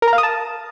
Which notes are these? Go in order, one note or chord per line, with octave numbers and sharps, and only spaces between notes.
A#4
A#5
F5
D#6
A5